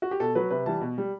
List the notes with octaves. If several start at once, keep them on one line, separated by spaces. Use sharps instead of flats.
F#4
G4
B2 A4
F#3 B4
C3 B4
E3 G3 A5
B2
G3